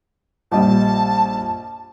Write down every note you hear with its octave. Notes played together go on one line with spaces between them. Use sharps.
A#1 G3 D#5 A5